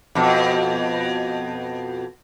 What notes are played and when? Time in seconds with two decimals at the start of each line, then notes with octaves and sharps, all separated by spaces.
0.15 F2 B2